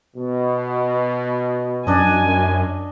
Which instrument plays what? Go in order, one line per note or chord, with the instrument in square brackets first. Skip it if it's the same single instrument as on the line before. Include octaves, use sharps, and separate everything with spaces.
[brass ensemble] B2
[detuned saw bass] F#2 [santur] D4 D#5 [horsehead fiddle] G#5